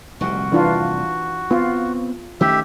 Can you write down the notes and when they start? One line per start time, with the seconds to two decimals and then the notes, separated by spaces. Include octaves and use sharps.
0.21 F1 C2 A#2 F#4
0.52 E3 D4 F4
1.51 B3 C4 F4
2.41 D#3 A3 C#4 G4 E5